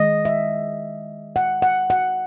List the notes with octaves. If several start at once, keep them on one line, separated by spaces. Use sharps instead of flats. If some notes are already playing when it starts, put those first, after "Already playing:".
Already playing: D#3 G#3 D#5
E5
F#5
F#5
F#5